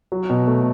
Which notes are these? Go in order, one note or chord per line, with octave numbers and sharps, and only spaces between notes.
F#3
B2
A3